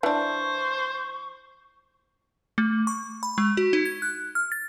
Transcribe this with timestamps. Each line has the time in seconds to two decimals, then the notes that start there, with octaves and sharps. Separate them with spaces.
0.03 E3 D4 C5 C#6
2.58 A3
2.87 C#6
3.23 B5
3.38 G#3
3.57 F#4
3.73 D#4
3.85 G#6
4.02 F#6
4.35 F6
4.52 A6